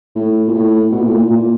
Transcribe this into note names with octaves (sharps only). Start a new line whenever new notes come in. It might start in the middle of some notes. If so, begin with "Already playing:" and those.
A2
A#2
A2
B2
A#2
A2
A#2
A#2